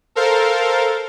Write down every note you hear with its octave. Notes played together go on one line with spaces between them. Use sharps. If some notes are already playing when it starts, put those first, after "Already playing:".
A4 A#4 C5 F5